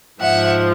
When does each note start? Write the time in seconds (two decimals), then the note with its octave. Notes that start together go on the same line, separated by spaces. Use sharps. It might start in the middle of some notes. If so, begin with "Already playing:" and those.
0.20 G#2 F3 E5 F#5